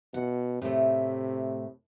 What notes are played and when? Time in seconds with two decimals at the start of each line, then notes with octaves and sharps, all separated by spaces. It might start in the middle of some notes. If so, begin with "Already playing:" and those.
0.14 B2 F#5
0.62 A2 C3 A3